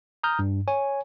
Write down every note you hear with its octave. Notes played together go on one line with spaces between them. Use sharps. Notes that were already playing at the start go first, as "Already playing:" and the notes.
A#5 D#6 F6 G6
G2
C#5 G#5